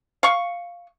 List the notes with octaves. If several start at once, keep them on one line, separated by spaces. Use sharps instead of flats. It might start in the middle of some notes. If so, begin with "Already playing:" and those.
F5 C#6